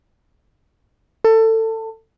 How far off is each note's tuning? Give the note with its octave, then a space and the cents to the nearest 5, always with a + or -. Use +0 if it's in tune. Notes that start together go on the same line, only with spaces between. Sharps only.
A4 +25